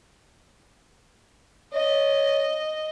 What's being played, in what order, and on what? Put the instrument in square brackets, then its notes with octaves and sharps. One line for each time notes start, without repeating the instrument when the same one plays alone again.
[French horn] C#5 [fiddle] D#5